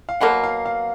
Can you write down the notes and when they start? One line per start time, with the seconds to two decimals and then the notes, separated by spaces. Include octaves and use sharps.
0.09 F5
0.21 B2 F#3 A#3 F#5
0.44 F5
0.66 F5